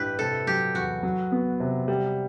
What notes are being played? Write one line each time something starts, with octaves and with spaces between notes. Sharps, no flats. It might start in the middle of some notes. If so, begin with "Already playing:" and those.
Already playing: A1 G2 E4 G4 B4
C3 A4
F#3 G4
E2 F#4
F#3
B3
C3
G3